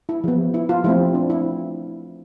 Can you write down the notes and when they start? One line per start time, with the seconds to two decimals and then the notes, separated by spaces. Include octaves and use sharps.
0.09 E4
0.24 F3 B3
0.54 E4
0.69 F4
0.84 F3 A3 C4 E4
1.14 D4
1.30 E4